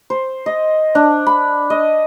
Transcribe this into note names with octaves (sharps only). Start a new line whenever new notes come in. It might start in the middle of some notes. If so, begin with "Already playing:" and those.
C5
D#5
D4
B5
D#5